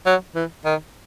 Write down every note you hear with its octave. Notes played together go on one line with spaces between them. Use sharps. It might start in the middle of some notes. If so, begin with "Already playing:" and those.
F#3
E3
D#3